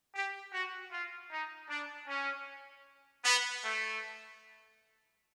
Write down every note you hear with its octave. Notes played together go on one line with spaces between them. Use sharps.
G4
F#4
F4
D#4
D4
C#4
B3
A3